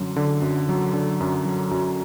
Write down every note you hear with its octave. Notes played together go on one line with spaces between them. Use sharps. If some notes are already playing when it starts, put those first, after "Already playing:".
Already playing: F#2 D3 F#3
D3
F#2
F#3
D3
F#2
F#3
F#2